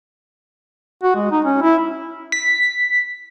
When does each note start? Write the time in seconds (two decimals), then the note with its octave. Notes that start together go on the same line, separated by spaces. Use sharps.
1.03 F#4
1.16 G#3
1.31 D#4
1.45 C#4
1.62 E4
2.32 B6